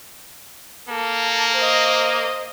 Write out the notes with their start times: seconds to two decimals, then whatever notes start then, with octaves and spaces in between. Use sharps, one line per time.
0.89 A#3 A4
1.56 C5 D#5